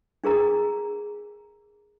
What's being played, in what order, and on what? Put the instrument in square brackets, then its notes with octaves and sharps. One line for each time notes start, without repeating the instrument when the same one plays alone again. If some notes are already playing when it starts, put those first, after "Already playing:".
[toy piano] D4 G#4 A#4 A#5